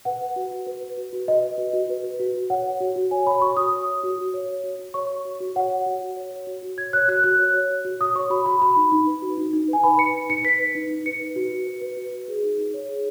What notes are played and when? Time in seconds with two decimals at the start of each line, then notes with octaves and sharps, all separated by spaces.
0.05 B4 F#5
0.22 B4
0.36 F#4
0.51 F#4
0.67 B4
0.83 B4
0.97 F#4
1.13 F#4
1.28 B4 D#5
1.43 B4
1.58 F#4
1.73 F#4
1.90 B4
2.04 B4
2.20 F#4
2.35 F#4
2.50 C#5 F#5
2.65 C#5
2.80 F#4
2.96 F#4
3.11 C#5 G#5
3.26 C#5 B5
3.42 F#4 C#6
3.57 F#4 D#6
3.72 C#5
3.87 C#5
4.04 F#4
4.18 F#4
4.34 C#5
4.49 C#5
4.64 F#4
4.79 F#4
4.94 C#5 C#6
5.10 C#5
5.25 F#4
5.40 F#4
5.56 C#5 F#5
5.71 C#5
5.86 F#4
6.02 F#4
6.17 C#5
6.32 C#5
6.47 F#4
6.63 F#4
6.78 C#5 G#6
6.93 C#5 F#6
7.08 F#4 F#6
7.24 F#4 F#6
7.39 C#5
7.54 C#5
7.70 F#4
7.85 F#4
8.00 C#5 D#6
8.16 C#5 C#6
8.30 F#4 B5
8.46 F#4 B5
8.61 F#4 B5
8.76 D#4
8.92 D#4
9.07 B4
9.22 F#4
9.38 D#4
9.53 D#4
9.68 B4
9.73 G#5
9.84 B4 B5
9.99 B4 C#7
10.14 D#4
10.29 D#4 C#7
10.44 B4 B6
10.59 B4
10.75 D#4
10.91 D#4
11.06 B4 C#7
11.21 B4
11.36 F#4
11.52 F#4
11.67 B4
11.82 B4
11.97 F#4
12.13 F#4
12.28 G#4
12.43 D#4
12.58 D#4
12.74 C#5
12.89 G#4